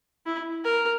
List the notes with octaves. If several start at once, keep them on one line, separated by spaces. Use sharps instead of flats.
E4
A#4